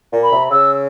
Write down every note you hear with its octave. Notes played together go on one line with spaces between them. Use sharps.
A#2
B5
C3
C#3 E6